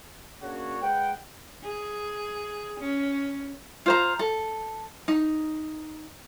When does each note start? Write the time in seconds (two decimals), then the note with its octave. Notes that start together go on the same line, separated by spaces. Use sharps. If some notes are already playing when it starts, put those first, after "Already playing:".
0.42 C#3 A#3 D4 F#4 C#5
0.81 G#3 B4 F#5 G5
1.64 G#4
2.80 C#4
3.86 F4 C5 A#5
4.19 A4
5.08 D#4